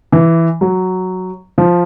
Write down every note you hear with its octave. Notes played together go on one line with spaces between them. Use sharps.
E3
F#3
F3